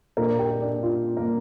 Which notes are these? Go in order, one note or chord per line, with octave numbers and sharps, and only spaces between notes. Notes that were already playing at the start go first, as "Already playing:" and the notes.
A#2 A#3 D4 A#4 A#5
G4 G5
D4 D5
F4
A#3 A#4